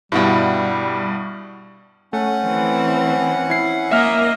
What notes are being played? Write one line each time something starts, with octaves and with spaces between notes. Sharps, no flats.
G2 B2 G3 E4 F#5 G5
A3 C#4 F#5
E3 C4
E4 C7
A#3 D#5 E5 F6